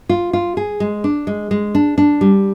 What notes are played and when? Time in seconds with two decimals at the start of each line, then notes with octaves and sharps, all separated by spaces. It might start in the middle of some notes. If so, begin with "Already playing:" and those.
0.09 F4
0.33 F4
0.57 G#4
0.80 G#3
1.04 D4
1.27 G#3
1.51 G#3
1.75 D4
1.98 D4
2.21 G3